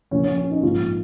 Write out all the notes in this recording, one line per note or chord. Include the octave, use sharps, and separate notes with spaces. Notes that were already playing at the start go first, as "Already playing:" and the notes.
A#1 A#2 F3 C#4
C#4
C#4
D#4
A#1 G#2 F3 F4